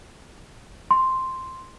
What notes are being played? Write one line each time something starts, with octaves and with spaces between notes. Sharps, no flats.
C6